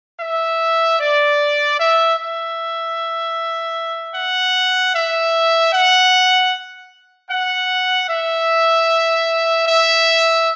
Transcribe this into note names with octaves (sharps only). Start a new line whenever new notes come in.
E5
D5
E5
E5
F#5
E5
F#5
F#5
E5
E5